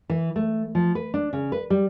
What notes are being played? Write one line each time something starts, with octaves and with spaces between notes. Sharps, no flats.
E3
A3
F3
B4
D4
C#3
B4
G3